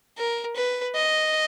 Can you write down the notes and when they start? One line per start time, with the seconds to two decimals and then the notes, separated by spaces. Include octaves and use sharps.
0.18 A#4
0.56 B4
0.95 D#5